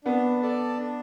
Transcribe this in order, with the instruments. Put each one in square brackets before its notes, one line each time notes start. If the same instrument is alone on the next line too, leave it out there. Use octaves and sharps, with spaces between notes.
[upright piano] B3 [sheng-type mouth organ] D4
[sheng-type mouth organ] A4 D5 A5
D4